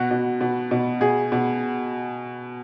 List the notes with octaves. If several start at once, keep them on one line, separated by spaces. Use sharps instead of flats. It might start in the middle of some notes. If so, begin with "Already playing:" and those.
Already playing: B2 F#4
B2
B2
B2
B2 G#4
B2